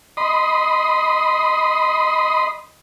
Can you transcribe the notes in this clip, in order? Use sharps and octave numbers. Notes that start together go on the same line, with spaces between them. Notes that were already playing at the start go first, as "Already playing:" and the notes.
D#5 B5 C6 D#6